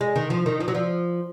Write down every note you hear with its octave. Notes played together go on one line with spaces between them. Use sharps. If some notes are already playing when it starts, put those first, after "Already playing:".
G#3
D#3
F3
D#3
F3
F#3
F3